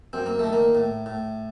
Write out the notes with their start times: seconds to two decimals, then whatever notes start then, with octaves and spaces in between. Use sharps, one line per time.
0.13 F#2 C4
0.26 A#3
0.39 D#3 A3
0.53 A#3
0.75 A2
1.06 A2